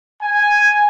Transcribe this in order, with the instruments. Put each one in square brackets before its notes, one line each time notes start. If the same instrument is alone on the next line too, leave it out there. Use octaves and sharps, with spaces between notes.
[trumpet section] G#5